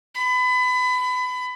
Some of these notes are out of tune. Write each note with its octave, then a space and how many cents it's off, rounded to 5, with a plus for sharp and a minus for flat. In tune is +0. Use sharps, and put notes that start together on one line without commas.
B5 +25